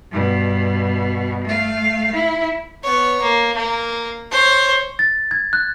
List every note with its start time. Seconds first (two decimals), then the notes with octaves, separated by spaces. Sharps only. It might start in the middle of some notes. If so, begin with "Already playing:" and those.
0.12 G2 B2
1.44 A3 F5
2.12 E4
2.83 B3 C#5
3.21 A#3
3.56 A#3
4.30 C5 C#5
4.99 A6
5.31 G#6
5.53 F#6